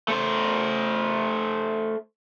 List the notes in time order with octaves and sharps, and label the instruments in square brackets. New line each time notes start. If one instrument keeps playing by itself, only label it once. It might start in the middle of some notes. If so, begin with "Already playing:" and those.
[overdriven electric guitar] A3 C5